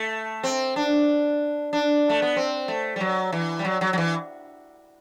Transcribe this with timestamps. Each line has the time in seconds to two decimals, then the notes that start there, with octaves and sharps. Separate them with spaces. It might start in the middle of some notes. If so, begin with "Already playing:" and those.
Already playing: A3
0.44 C4
0.76 D4
1.73 D4
2.10 A3
2.22 B3
2.36 C4
2.68 A3
2.96 G3
3.00 F#3
3.32 E3
3.59 G3
3.65 F#3
3.81 F#3
3.93 F#3
3.98 E3